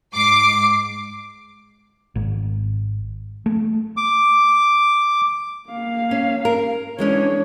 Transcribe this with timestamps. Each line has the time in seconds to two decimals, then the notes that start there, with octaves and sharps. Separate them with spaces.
0.14 G#2 D6 C7
2.16 G#1
3.46 A3
3.97 D6
5.69 A#3 F5
6.11 C#4
6.45 A#4
6.99 E3 G#3 C#4 D4 C#5